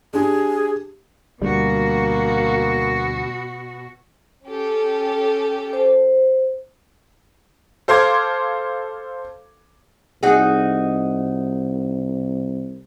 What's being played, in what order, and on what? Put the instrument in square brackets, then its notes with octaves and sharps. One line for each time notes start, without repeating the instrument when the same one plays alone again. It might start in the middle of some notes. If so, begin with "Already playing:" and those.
[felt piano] D4 G4 [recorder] G#4
[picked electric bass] D2 G3 [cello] B2 F#4 [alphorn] A#3
[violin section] C#4 G4 A4
[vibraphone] C5
[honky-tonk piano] A4 C5 F5 C6 D6 G#6
[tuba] C2 [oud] D#4 F#4 G#4